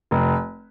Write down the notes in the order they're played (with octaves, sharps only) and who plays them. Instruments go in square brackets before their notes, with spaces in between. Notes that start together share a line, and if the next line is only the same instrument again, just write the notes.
[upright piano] F1